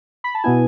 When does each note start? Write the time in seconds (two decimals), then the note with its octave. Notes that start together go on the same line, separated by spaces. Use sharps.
0.24 B5
0.34 A5
0.44 B2 B3 E4 G#5